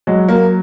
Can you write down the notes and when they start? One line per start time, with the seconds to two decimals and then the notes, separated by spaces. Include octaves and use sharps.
0.07 F#3 G#3
0.29 A#3